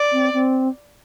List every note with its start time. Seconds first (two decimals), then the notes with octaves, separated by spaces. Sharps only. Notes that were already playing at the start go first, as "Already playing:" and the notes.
Already playing: D5
0.12 C4
0.33 C4